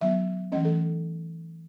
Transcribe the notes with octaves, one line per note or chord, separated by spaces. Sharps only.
D#3 F#3 B3 E5
E3 A3 C#4 D#5
A4